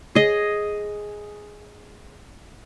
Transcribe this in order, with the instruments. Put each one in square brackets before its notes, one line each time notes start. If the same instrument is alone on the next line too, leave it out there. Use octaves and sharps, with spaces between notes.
[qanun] G#4 D#5